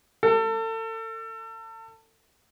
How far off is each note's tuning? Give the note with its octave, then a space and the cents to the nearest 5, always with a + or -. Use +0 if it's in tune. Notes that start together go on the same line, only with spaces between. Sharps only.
A4 +35